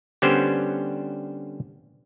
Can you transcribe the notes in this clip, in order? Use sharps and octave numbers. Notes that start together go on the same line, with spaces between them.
D3 G3 B3 C#4 G4 C5